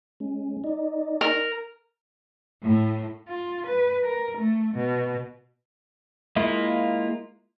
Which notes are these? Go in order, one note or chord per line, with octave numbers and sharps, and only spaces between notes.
G#3 C#4
D#4 D5 D#5
A#4
A2
F4
B4
A#4
A3
B2
G#3 A#3 E4 F4